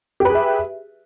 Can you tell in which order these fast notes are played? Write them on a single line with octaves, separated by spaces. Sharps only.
G4 B4 G#4 E5